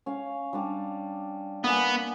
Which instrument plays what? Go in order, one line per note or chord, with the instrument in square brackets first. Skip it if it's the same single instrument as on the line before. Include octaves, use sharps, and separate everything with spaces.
[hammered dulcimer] C#4 F5
G3 D4 D6
[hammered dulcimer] A#3 G#5 [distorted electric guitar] B3